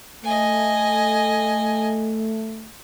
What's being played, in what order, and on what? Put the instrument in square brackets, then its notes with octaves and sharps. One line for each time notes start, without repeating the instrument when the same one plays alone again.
[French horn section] A3 [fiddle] D#5 G#5